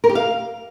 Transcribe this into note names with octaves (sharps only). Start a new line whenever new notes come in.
A#4
G4
F5